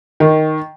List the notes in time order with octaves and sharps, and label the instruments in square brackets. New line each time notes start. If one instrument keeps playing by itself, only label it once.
[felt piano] D#3